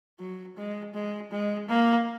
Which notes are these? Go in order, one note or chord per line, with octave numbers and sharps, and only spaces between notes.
F#3
G#3
G#3
G#3
A#3